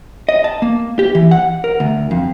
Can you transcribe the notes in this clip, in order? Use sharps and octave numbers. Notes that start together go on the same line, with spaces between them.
D#5
A5
A#3
G4
E3
F#5
A#4
D2
F2